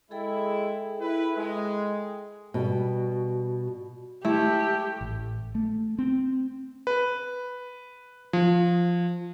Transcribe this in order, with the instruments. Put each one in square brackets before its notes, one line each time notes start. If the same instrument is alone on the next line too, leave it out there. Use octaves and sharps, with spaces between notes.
[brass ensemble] G#3 E4 [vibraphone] G#4 A4 G5
[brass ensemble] E4 B4
G#3
[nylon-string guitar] B2 G3
[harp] A3 [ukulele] E4 [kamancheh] G4
[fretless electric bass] A1
A3
C4
[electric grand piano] B4
F3